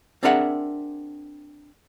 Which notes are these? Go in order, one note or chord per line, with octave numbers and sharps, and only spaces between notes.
C4 D4 G#4 A#4 E5 F#5